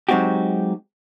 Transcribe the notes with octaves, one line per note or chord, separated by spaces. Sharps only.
F#3 G#3 C4 D#4 F#4 G4